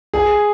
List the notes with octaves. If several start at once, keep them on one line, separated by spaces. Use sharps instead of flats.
G#4